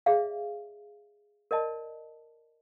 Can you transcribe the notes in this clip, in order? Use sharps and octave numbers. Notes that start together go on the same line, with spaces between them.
G#4 D5 E5 F5
A#4 D5 D#5 A5